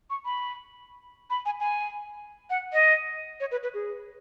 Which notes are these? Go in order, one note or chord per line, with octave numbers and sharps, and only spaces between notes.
C#6
B5
B5
G#5
G#5
F#5
D#5
C#5
B4
B4
G#4